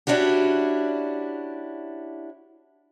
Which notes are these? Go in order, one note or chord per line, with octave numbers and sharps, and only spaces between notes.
C#4 D4 E4 F#4 G4